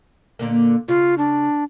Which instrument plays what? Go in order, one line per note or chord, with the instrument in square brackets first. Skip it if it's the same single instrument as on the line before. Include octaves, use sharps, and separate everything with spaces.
[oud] A#2 D3 A#3
[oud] C#3 [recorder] F4
[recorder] D4